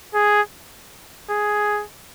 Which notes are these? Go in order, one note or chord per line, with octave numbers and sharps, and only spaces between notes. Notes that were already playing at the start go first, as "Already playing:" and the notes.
G#4
G#4